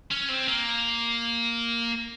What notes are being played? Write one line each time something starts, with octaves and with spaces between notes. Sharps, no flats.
C#4
C4
A#3